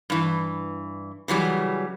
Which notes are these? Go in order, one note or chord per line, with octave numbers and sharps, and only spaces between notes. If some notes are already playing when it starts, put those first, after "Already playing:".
G2 E3
C#3 E3 F#3 G3